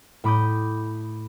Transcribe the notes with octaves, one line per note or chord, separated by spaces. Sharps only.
A2 B5 D6 D#6 G6